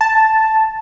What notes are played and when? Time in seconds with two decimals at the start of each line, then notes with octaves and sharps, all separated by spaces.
0.01 A5